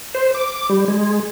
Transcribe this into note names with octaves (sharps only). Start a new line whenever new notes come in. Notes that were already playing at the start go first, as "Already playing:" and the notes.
C5
D6
G3
G#3